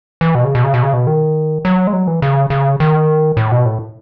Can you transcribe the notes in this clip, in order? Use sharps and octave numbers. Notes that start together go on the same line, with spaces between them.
E3
B2
C#3
B2
C#3
B2
C#3
B2
D#3
F#3
G#3
F#3
E3
C#3
C#3
D#3
A2
B2
A2